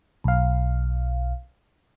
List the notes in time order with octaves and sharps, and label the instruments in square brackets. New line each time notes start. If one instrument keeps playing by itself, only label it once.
[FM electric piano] B1 F5